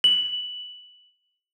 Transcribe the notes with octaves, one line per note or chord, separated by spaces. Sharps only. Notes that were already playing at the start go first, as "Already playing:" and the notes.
F#7